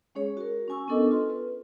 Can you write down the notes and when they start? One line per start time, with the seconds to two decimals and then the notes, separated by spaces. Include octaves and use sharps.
0.15 G#3 C#4 G#4 C#5
0.37 F#4 A#4
0.68 C#4 F#4 G#5 C#6 E6
0.88 B3 C#4 D4 A4 A#4 D#5
1.11 F4 A4 B4 C6
1.30 B4